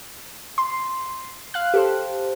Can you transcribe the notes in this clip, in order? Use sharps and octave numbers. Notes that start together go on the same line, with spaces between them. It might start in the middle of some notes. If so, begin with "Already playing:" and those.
C6
F5 F#6
G4 A4 C5